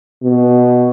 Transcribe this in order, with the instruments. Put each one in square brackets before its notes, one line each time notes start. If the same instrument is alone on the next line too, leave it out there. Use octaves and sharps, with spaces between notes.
[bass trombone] B2